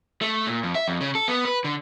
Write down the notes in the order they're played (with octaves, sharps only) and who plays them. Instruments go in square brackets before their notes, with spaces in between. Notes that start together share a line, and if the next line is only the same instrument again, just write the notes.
[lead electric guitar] A3
A#2
F2
E5
F2
C#3
A4
B3
B4
D3